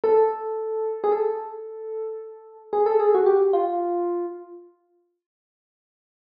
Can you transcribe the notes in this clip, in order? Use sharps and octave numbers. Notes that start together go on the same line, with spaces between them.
A4
G#4
A4
G#4
A4
G#4
F#4
G4
F4